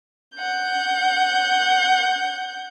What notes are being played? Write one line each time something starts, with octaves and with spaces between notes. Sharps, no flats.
F#5 G6